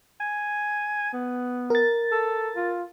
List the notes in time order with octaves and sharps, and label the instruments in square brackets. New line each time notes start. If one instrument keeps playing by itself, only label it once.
[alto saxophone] G#5
B3
[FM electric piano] A#4 A6
[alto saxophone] A4
F4